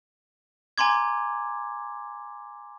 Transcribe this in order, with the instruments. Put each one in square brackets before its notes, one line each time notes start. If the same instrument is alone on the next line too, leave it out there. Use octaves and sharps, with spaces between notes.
[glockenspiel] G#5 A#5 C6 D6 G#6